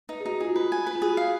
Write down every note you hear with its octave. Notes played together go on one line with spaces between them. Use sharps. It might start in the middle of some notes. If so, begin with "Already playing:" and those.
D#4 B4
G#4
D#4 F#4
F4 G#4
F#4
F4 B4
G#5
B4
F4
F#4 G#4
F5